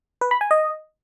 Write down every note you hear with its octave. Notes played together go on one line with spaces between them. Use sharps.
B4
B5
G#5
D#5